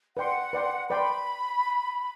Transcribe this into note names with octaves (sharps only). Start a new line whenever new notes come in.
B4 D5 F#5 G5 C6
B4 D5 G5 C6
B4 D5 G5 B5 C6